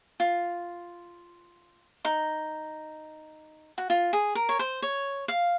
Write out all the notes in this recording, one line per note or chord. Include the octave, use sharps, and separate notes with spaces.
F4
D#4
F#4
F4
G#4
A#4
C#5
C5
C#5
F5